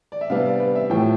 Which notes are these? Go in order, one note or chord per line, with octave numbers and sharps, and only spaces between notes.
D5
E5
C3 G3 B3 D4 F5
D5
B4
E5
A2 F3 A3 G5